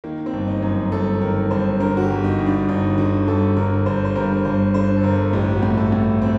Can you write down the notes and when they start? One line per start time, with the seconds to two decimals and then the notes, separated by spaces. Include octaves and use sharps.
0.04 D#3 A#3
0.26 C4
0.33 G1
0.48 D#4
0.62 F#2
0.92 G1 A4
1.21 D#3 A#4
1.51 G1 C5
1.80 D3 A#4
1.97 F#4
2.02 G4
2.10 G1
2.24 D#4
2.39 G2
2.46 D4
2.69 G1 D#4
2.98 D3 F#4
3.27 G1 A4
3.56 D3 A#4
3.86 G1 C5
4.05 C5
4.15 G2 A#4
4.45 G1 C5
4.74 D3 C5
4.96 A4
5.04 G1 A#4
5.33 A1 G4
5.56 F#4
5.63 A2
5.77 A4
5.92 A2
6.22 C4